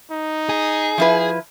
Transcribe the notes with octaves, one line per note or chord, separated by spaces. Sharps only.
D#4
G#4
F3 E4 B4